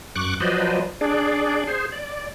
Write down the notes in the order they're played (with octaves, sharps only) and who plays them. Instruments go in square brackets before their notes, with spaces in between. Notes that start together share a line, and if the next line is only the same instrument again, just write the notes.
[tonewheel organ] F#2 C#6 D6 F#6
F3 F#3 B4 C5 D5 D#5
D4 G#4 D5
G#4 C5
D5